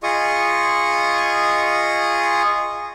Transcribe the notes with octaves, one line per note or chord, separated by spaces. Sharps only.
F4 G#4 D#5 C#6 D#6